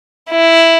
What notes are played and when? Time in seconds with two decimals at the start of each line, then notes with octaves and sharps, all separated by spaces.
0.31 E4